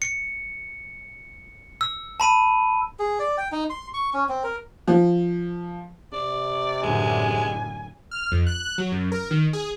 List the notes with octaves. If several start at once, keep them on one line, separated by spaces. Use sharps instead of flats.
C#7
E6
A5 B5 D#7
G#4
D5
G5
D#4
C6
C#6
C#4
C4
A#4
F3
C3 D5
F#2 A2 D3 G#3 G#5
F6
F2
F#6
F#6
F#3
F#2
A#4
D#3
G#4